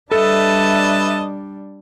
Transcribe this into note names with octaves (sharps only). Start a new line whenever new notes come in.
G3 D4 A4 B4 D#5 E5 A5